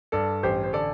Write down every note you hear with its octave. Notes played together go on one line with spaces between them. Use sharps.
G2 A4 D5
A1 G4 C5
C5
D3 A4 D5